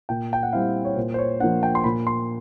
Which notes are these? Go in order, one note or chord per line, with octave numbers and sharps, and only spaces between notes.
A#2 G5
G5
F#5
G3 C4 E4 F5
C#5
A#2 C5
C5
C#5
F3 A#3 D4 F#5
G5
C6
A#2 B5
C6